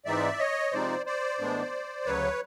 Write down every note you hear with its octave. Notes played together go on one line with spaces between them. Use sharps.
G#2 E3 G#3 C4 D#4 D5 E5
C#5 D#5
C3 F3 G#3 C4 D#4 C5 D5
C5 D5
A2 E3 G#3 B3 D4
D2 C#3 F#3 B4 C#5